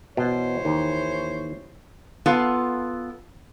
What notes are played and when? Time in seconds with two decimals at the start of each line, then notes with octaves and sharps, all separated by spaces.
0.17 B2 E3 C5 C#5
0.65 D#2
2.26 B3 F4 A4